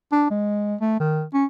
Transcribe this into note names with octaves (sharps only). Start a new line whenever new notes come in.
D4
G#3
A3
D#3
C#4